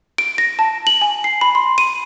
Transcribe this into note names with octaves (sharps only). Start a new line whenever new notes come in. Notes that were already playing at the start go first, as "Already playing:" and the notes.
D7
A#6
A5
F#7
G#5
C7
B5
C6
D#7